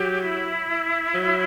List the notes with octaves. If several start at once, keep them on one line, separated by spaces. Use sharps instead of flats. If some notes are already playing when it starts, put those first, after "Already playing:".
Already playing: F#3 G4
E4
F#3